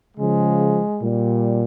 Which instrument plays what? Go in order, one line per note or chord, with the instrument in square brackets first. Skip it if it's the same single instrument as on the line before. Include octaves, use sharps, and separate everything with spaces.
[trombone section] C#3 F3 G#3
A#2 G3